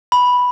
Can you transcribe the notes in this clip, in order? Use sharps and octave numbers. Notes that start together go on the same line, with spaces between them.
B5